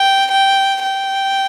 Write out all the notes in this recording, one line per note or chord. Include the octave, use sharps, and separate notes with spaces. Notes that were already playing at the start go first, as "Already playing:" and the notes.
Already playing: G5
G5
G5